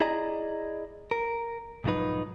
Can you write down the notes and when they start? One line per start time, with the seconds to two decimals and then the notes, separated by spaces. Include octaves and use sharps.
0.01 E4 G#4 D5 D#5 A#5
1.11 A#4
1.84 B1 G#2 F3 F#3 D#4 B4